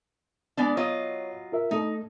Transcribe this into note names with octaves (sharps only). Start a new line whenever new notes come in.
G#3 B3 D4
F#3 F4 C#5 D#5
F4 A#4 E5
A3 D#4 A4